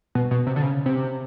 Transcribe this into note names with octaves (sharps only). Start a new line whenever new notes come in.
B2
B2
C3
D3
C#3
C3